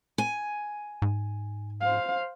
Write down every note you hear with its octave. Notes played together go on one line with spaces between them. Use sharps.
G#5
G#2
C5 F5